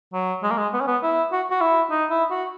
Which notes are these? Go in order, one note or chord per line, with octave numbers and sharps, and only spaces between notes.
F#3
G#3
A#3
G#3
B3
C#4
B3
E4
F#4
F#4
E4
D#4
E4
F#4